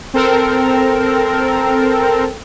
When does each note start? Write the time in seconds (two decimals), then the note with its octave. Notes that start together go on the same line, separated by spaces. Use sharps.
0.14 C4 A4 A#4